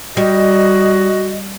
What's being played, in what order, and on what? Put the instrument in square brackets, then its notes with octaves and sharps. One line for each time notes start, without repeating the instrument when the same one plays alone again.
[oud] G3 [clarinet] F#4 [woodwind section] D#5